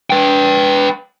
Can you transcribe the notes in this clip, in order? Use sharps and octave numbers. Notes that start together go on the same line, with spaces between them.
B4 G5